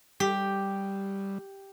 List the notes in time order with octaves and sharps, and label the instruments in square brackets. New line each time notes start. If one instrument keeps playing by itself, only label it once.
[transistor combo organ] G3 [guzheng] G4